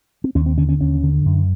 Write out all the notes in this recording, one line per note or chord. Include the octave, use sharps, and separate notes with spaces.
C4
D#2 C#4
C4
D3 C#4
C#4
D#2 C#4
D3
F#2